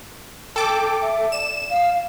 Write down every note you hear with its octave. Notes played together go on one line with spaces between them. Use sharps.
A4 G5 D6
E5
D5 E7
F5